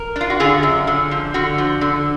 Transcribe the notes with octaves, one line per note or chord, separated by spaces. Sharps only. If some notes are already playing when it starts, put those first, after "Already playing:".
Already playing: A#4
D4 F4
F#4
D3 F4 G#4
F#2
D3
F3
D3 F#4
F3
D3